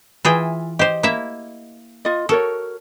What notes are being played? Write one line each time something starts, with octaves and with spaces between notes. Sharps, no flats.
E3 F4 G#4 E5 G5
G4 C5 D#5
A#3 E4 E5
F4 D#5
F#4 A4 A#4 C#5